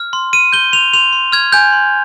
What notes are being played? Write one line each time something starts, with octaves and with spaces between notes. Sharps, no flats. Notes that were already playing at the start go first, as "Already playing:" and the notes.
Already playing: F6
C6
F6 D#7
G6 G7
C6 F7
C6 F7
C6
F6 G#6
G#5 G6
C6